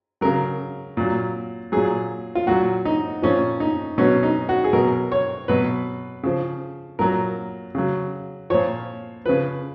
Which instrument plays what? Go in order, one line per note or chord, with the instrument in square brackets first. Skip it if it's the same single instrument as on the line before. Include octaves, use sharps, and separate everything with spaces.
[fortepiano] C#3 F#3 A#4
A#2 F#3
A#2 F#3 G#4
F4
A#2 F#3 F#4
D#4
A#2 F3 C#4
D#4
B2 F#3 C#4
D#4
F#4
G#4
B2 F#3 A#4
C#5
B2 F#3 B4
C#3 F3
A#2 F#3 A#4
C#3 F#3
A#2 F3 C#5
C#3 F3 B4